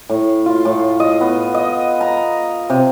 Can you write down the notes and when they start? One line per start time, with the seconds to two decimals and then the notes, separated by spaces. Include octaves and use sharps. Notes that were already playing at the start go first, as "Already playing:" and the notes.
0.10 A2
0.46 F4
0.65 A2
1.00 D#5
1.21 B3
1.54 D#5
2.01 A#5
2.70 C3